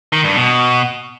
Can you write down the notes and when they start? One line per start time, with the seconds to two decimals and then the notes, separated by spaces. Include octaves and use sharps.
0.13 D#3
0.24 G2
0.36 B2